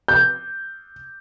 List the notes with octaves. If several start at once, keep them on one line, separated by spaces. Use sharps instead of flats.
G6